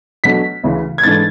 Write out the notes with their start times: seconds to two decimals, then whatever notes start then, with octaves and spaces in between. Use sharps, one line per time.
0.24 B2 F#3 A3 D4 B6
0.64 D2 C#3 E3
0.98 G#6
1.03 G#2 E3 A3 D4 A6